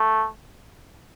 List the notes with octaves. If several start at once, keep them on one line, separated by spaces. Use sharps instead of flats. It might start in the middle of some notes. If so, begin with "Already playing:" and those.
Already playing: A3